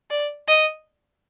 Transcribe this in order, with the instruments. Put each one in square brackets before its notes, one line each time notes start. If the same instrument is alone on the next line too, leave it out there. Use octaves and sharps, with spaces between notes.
[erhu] D5
D#5